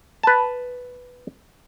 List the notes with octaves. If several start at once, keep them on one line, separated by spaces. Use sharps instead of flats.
B4 A5